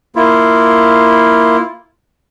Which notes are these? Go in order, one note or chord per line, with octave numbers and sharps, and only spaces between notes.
A#3 E4 F4